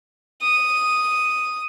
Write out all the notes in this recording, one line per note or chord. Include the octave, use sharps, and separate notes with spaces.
D#6